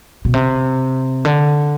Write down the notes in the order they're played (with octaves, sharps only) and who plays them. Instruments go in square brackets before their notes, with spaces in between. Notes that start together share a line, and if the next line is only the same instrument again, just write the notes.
[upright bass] B2
C3
D3